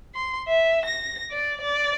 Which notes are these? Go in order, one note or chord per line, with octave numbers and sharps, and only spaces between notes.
C6
E5
A#6
D5
D5